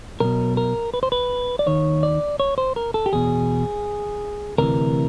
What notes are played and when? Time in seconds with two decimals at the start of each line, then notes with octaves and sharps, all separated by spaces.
0.20 B1 B2 A#4
0.57 A#4
0.94 B4
1.03 C5
1.12 B4
1.59 D5
1.66 D#2 D#3 C#5
2.03 D5
2.40 C#5
2.58 C5
2.76 A#4
2.94 A4
3.06 G4
3.13 E2 B2 G#4
4.58 D2 C3 E3 A#4